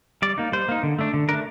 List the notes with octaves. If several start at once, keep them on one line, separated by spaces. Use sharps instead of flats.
G3 D5
A#3 D#4
G3 C5
A#3 D#4
D3
A3 D4
D3
A3 D4 A#4